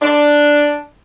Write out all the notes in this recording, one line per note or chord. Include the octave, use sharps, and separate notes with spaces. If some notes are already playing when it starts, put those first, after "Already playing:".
D4